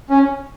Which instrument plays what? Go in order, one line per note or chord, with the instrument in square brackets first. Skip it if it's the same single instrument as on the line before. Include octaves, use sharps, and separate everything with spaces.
[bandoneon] C#4